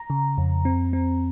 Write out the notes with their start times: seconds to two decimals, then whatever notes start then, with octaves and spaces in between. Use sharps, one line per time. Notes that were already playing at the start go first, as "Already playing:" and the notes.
Already playing: A#5
0.10 C#3
0.38 F2
0.65 C4
0.93 C4